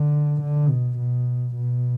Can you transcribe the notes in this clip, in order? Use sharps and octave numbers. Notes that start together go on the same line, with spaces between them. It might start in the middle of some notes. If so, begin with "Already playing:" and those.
Already playing: D3
D3
B2
B2
B2